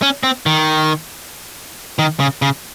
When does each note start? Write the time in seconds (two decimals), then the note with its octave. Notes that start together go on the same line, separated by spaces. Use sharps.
0.02 C#4
0.23 C4
0.46 D#3
1.99 D#3
2.20 C#3
2.42 C#3